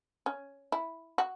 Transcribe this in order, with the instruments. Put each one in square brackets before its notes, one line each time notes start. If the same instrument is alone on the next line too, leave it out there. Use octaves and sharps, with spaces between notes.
[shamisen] C#4
E4
F#4